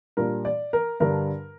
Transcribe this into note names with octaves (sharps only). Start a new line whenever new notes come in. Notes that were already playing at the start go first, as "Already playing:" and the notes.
A#2 G3 D4 A#4
D5
A#4
G2 D3 G3 D4 A#4